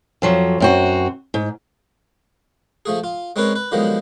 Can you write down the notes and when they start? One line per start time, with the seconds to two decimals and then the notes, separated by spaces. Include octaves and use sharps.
0.22 F2 F3 F#3
0.60 F#2 C4 F#4
1.34 G#2
2.86 F3 A3 G#4
3.04 F4
3.36 G#3 C4 C#4 A#4 B4 C#5
3.56 B4
3.72 D3 D#3 F3 F#3 G#3 B3